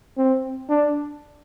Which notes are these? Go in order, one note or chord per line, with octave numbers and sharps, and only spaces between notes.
C4
D4